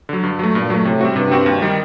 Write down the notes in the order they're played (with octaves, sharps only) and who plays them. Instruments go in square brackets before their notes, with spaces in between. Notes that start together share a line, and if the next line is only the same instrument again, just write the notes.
[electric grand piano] D3 F#3
G2
F#3 A3
[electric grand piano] G2 [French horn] A#2
[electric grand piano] F#3 A3
[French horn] A2 [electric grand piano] C3
[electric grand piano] G3 C4 F#4
[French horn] G2 [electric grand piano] C3
[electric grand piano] G3 C4 F#4
D#2
D#3 G3